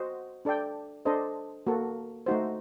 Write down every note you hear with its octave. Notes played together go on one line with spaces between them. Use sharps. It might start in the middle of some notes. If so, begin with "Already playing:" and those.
Already playing: F#4 C5 D#5 F#5
D4 A4 D5 G5
D4 A4 C5 D#5
A#3 F#4 A4
A3 D#4 F#4 C5